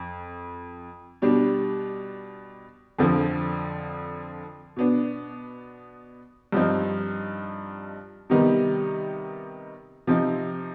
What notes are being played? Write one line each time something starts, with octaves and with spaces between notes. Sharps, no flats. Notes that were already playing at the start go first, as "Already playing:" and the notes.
Already playing: F2
B2 G3 D4
F2 D3 F3 C4
B2 B3 D4
G2 F3 C4 D#4
C3 D#3 G3 B3 D#4
C3 F3 C4 D#4